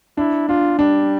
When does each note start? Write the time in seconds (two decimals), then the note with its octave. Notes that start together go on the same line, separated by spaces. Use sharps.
0.17 D4 E4
0.49 D4 F4
0.79 G3 D4